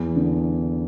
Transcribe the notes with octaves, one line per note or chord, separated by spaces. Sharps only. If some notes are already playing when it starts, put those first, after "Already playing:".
Already playing: E2 E3
D3